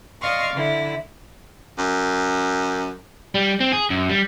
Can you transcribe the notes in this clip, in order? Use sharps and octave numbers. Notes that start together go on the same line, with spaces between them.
D5 D#5 F5 C6 C#6
D3 E4
F#2
G3
C4
G#4
F#2
G3